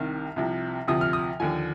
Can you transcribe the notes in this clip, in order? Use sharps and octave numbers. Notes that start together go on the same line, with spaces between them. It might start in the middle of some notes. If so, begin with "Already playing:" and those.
Already playing: C2 C3 D#3 F6
C2 C3 F3
D2 C3 F3 D#6
F6
D#6
D#2 D3 F3 G#5